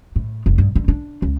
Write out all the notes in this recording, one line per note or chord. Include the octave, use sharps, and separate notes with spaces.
A2
F1
G2
D3
D4
C#2